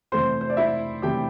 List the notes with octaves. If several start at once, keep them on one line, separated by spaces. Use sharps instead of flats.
C3 E3 A3 C4 C5 C6
C5
D5
E4 E5
C3 E3 A3 C4 G4 G5